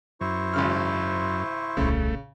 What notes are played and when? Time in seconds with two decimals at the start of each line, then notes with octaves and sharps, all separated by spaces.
0.21 F#2 E4 C5 C#6
0.53 G#1 C#3 F6
1.77 D#1 C2 C#3 A3